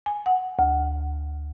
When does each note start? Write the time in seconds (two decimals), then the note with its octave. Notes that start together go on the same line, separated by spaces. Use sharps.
0.06 G#5
0.26 F#5
0.59 D2